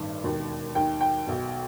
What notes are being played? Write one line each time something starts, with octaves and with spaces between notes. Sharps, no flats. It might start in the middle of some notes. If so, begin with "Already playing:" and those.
Already playing: A1 G2 D#3
E1 D#2 D#3
D#2 D#3 G5
G5
B1 B2